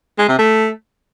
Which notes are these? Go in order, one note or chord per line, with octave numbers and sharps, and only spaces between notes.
G#3
C3
A3